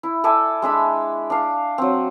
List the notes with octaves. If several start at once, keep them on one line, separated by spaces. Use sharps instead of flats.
E4
A4 D5 E5 G#5
G#3 D4 E5 B5
D4 F5
F#3 C4